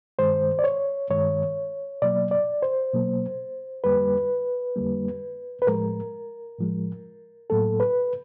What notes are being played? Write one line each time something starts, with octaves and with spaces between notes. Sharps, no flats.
G2 D#3 G#3 C5
D5
C#5
G2 D#3 G#3 C#5
B2 F#3 A#3 D5
D5
C5
B2 F#3 A#3
F2 D3 G3 A#3 B4
F2 D3 G3 A#3
B4
A2 F3 G#3 A#4
A2 F3 G#3
A2 F#3 A#3 A4
B4